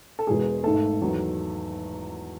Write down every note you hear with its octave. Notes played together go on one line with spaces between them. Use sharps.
A4
E1 E2 B2 G#3 G#4
G#1 G#2 D#3 A3 A4
E2 D#3 F#3